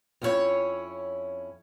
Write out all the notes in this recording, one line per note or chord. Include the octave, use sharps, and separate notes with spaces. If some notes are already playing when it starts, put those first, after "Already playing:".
F2 C#4 E4 G4 C#5